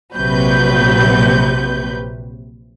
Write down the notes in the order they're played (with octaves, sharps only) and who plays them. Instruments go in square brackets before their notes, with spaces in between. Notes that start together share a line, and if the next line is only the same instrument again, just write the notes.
[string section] A#1 C3 F#3 B4 G6